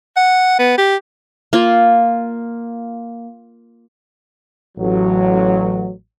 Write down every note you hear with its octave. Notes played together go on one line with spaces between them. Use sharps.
F#5
B3
G4
A#3 F4
A1 F#3